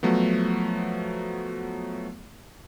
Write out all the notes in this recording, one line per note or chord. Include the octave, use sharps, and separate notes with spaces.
F3 F#3 A3 B3